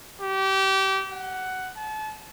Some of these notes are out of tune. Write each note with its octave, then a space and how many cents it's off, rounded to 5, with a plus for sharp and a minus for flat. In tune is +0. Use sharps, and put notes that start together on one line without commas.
G4 -25
F#5 +10
A5 -35